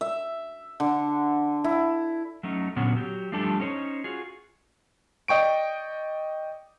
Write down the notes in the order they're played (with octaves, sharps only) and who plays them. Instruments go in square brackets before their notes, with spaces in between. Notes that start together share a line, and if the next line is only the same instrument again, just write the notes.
[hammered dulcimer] E5
D3
E4
[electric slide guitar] F#3 A3 C#4 D#4
A#2 D3 F#3 B3 C#4 F#4
F#3 G4
F3 G3 A3 D4 G4 A4
C#4 D#4 C5 C#5
F4 F#4 G#4
[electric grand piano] D5 D#5 G5 C#6 D7